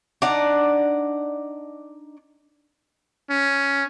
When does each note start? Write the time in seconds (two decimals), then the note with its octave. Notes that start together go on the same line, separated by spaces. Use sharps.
0.22 D4 D#4 D5 F#5
3.30 C#4